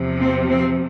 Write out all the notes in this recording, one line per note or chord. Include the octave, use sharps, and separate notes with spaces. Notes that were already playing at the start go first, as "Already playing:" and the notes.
Already playing: E2 C3 F3
C4
C4